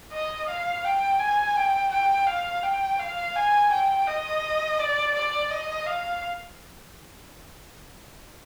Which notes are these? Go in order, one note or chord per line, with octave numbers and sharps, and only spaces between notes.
D#5
F5
G5
G#5
G5
G5
F5
G5
F5
G#5
G5
D#5
D5
D5
D#5
F5